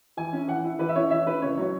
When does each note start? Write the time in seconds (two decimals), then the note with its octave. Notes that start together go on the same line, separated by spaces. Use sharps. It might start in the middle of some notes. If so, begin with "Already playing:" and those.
0.17 E3 G#5
0.33 C#4 E4
0.48 E3 F#5
0.64 C#4 E4
0.79 E3 B4
0.89 E5
0.95 C#4 E4 C#5
1.11 E3 E5
1.27 C#4 E4 B4
1.42 C#3 C#5
1.57 F#3 C#4 C#5